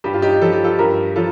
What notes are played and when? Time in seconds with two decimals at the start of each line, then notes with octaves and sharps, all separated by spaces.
0.04 G2 G4
0.14 F4
0.22 D#4 G4
0.41 F3 A4
0.52 G4
0.64 F4 A4
0.79 G2 G4 A#4
1.16 F3 F4 A4